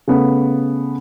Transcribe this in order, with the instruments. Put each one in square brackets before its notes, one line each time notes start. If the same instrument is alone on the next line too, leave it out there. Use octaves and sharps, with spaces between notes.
[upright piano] C#3 A3 B3